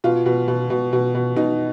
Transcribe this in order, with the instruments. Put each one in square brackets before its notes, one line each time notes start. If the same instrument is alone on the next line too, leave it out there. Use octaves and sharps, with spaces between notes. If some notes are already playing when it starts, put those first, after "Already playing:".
[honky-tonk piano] B2 F4
B2
B2
B2
B2
B2
B2 D#4